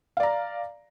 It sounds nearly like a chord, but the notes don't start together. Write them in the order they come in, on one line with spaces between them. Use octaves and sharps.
F5 D5 A#5